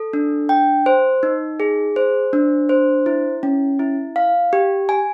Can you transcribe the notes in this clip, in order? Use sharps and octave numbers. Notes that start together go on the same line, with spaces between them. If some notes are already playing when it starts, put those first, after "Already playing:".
Already playing: A4
D4
G5
C5
D#4
G#4
C5
D4
C5
E4
C#4
E4
F5
G4
G#5